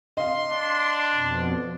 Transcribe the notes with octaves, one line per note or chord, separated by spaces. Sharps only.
D#5 F5 C6
D4
F2 B2